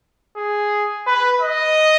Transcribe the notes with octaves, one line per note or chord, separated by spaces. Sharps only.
G#4
B4
D#5